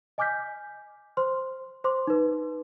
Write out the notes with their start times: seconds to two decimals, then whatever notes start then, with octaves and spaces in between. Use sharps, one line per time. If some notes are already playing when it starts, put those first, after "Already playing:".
0.18 D#5 G#5 D6 F6 G6 B6
1.17 C5 C6 F6
1.84 C5 C6 D6
2.07 D#4 B4